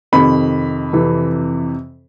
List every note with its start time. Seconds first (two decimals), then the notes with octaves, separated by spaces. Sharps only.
0.12 F2 C3 D#3 B5
0.93 F2 C3 E3